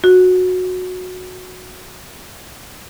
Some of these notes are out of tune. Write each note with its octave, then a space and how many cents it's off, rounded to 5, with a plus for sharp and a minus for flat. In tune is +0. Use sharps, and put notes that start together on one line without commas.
F#4 -15